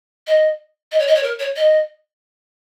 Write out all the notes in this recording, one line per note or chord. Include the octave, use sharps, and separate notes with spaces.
D#5
D#5
C#5
D#5
C#5
A#4
C#5
D#5